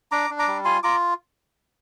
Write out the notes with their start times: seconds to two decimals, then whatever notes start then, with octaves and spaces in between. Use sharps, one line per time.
0.11 D4 A#5 D6
0.30 D4
0.39 A#5 D6
0.48 G3
0.65 F4 G#5 C6
0.83 F4 A#5 D6